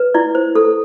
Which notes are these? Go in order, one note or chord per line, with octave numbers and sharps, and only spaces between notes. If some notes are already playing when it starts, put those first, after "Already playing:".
Already playing: B4
E4 D5
C5
A4